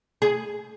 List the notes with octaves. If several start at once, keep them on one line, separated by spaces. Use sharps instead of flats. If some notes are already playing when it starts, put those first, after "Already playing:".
G#4